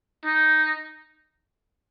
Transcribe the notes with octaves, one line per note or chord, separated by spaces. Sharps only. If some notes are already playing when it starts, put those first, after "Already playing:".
D#4